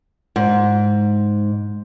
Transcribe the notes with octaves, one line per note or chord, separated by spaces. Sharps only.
G#2